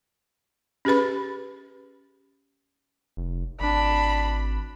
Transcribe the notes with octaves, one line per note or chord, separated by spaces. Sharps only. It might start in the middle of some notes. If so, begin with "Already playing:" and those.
C#4 G4 G#4 B4 B5
F1
G#1 D4 B5